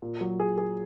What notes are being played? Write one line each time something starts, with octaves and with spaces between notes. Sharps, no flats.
A#2
F#3
G#4
G#4